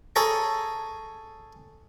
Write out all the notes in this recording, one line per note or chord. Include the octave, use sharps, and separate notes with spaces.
G#4 A4 C#5 A#5